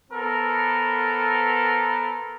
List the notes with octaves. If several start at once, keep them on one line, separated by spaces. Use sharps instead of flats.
B3 A4 A#4 C5